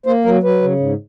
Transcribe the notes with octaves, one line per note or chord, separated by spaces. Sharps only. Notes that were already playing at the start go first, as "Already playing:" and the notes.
A#3 C5
F#3 A#4
F#3 B4
C#3
G#2